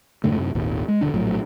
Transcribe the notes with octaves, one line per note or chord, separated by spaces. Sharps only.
F2 G#2 D3 A3
F#2 C3
G#1 D#2 A#2
G#3
E1 D3 D4
A#1 A2 F#3